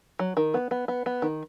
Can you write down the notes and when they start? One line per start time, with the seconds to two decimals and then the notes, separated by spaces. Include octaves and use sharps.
0.19 F#3
0.37 D#3
0.54 B3
0.71 B3
0.88 B3
1.06 B3
1.22 D#3